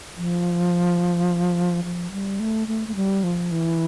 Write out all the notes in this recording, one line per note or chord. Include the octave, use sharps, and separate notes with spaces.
F3
F3
G3
A3
A3
A3
G3
F3
E3